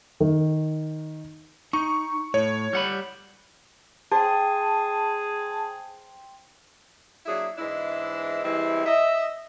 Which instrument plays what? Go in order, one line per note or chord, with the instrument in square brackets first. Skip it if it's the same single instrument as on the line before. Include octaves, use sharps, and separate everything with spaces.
[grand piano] D#3
[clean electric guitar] D#4 [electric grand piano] C#6
[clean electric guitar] A2 [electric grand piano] C#5
[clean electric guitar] G3 F#5 B5
[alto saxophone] G#4 [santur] C5 G5 [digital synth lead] A5
[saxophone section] F#3 A#3 D4 E4 F#4 G#4
G#2 E3 G#3 D4 E4
E3 G3 G#3 C4 E4
D#5 E5